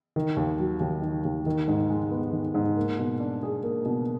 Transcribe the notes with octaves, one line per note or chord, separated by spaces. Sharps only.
D#3
D#2
F#3
D#2
D#3
D#2
D#3
G#2
G#3
B3
D#3
G#2
A#3
B2
D4
G#4
A#3
B2